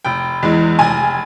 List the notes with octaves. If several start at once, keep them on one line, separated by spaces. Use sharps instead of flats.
F1 G5
E2 E3 G#3
F1 G#5